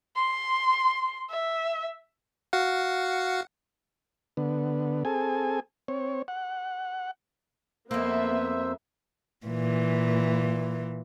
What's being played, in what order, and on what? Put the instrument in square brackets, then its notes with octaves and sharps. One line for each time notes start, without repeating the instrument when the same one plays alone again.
[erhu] C6
E5
[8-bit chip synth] F#4 F5 F#5
[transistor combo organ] D3 B3
C4 G#4 A4 G#5
C4 C#5
F#5
[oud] F2 A#3 [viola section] B3 E5 [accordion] C5 E6
[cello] A#2 E3